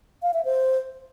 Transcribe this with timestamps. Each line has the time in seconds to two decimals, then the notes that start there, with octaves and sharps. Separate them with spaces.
0.22 F5
0.34 E5
0.45 C5